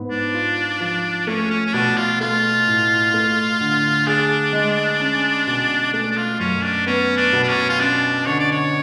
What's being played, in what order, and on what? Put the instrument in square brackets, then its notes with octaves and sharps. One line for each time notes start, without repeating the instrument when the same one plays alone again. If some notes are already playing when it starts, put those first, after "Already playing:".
Already playing: [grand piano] G#2 B3
[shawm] D4
[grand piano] F4
F3
[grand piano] A3 [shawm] C#4
[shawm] C#4
C#4
[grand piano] B2 [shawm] D4
[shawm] F4
[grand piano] A3 [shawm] F4
[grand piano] A2
A3
D3
[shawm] D4 [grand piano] G#4
[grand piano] G#3
C#4
B2
[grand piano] A3 [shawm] D4
[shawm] D4
F4
[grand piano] F#2 [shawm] C#4
[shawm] D4
[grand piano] B3 [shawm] C#4
[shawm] D4
[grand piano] B2
[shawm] D4
C#4
F4
[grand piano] C#4 [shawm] D4
[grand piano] D3 [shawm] C#5
[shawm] D5
C#5